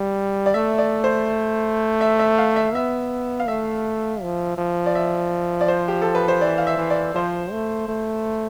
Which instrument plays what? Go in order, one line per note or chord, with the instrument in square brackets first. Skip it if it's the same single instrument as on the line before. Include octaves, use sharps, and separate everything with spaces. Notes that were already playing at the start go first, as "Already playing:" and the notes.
Already playing: [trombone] G3
[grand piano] D5
[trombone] A3 [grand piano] E5
[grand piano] D5
C5
E5
E5
F5
E5
[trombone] B3 [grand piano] E5
[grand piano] F5
[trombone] A3 [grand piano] E5
[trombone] F3
F3
[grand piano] D5
E5
D5
C5
G4
A4
B4
C5
[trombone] E3 [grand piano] D5
[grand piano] F5
E5
[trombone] E3
[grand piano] D5
[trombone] F3 [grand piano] C5
[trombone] A3
A3